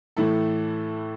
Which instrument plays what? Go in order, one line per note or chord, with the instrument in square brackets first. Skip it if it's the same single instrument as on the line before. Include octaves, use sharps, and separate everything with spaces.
[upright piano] A2 E3 A3 E4 A4